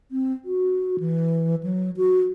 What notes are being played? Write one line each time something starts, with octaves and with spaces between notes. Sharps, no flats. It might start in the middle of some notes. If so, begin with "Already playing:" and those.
C4
F#4
E3
F#3
F#4